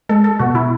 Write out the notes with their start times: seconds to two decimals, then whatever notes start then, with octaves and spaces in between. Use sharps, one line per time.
0.09 G#3 A4
0.24 A4
0.39 B2 F#4
0.55 E4